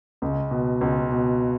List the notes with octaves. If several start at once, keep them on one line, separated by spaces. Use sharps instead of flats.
C#2
B2
C#2
B2